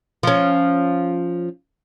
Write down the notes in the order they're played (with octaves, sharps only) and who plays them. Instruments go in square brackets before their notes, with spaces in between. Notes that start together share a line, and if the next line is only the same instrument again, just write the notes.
[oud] F3 C#4